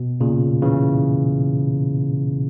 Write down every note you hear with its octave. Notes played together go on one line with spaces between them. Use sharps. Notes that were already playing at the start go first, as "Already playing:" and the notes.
Already playing: B2
A#2 C#3
C#3 E3